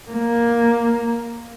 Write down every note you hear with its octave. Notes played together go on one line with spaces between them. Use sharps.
A#3